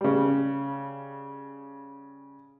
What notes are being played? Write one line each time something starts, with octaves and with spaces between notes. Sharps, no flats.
C#3 G3